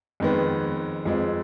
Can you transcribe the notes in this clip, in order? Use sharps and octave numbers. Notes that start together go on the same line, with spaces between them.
F2 D#3 G#3 B3
F2 F3 G#3